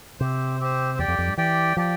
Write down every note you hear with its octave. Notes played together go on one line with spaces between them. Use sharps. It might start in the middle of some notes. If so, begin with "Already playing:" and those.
C3 C4 G4 C5
C4 G4 C5
E2 G4 D5 G5
F2
F2
G2
E3 G4 D5 G5
F3 G4 D5 G5